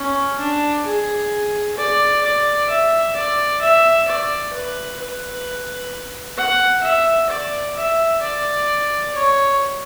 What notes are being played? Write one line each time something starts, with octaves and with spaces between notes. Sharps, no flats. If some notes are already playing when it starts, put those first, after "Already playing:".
Already playing: C#4
D4
G#4
D5
D5
E5
D5
E5
D5
B4
B4
F#5
E5
D5
E5
D5
C#5